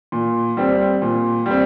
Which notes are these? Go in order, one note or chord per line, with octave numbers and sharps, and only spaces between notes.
A#2
G3 C4
A#2
G3 C4